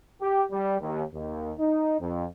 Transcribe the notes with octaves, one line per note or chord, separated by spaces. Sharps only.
G4
G3
D#2
D#2
D#4
F2